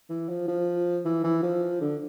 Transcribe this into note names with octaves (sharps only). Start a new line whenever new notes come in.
E3
F3
F3
E3
E3
F3
D3